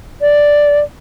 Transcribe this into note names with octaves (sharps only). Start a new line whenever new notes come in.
D5